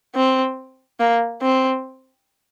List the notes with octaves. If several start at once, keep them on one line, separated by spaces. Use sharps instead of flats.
C4
A#3
C4